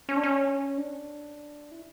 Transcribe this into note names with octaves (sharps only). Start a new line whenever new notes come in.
C#4
D4
C#4
D4
E4